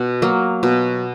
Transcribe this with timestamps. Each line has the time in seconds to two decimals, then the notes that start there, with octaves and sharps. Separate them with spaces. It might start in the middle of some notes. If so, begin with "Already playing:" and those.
Already playing: B2 F#5
0.22 F#3 A#3
0.63 B2